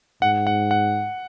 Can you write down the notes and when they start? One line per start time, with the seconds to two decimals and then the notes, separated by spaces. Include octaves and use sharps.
0.22 G#2 F#5
0.47 F#5
0.71 F#5